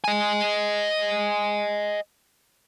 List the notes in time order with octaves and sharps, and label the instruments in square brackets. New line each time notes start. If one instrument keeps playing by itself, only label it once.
[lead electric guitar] D#5 G#5